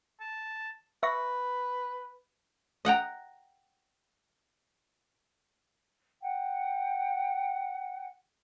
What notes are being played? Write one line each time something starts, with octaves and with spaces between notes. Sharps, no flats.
A5
B4 E5 C#6 A#6
D#5 F#5 G5 A#5
F#5 G5